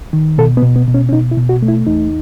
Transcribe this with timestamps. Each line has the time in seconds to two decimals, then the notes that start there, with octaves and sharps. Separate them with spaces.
0.13 D#3
0.38 B2 A4
0.57 B3
0.63 B2
0.76 B3
0.88 B2
0.94 C#4
1.09 C#4
1.12 B2 D#4
1.31 E4
1.38 B2
1.49 F#4
1.62 A3
1.68 E4
1.87 E2 D#4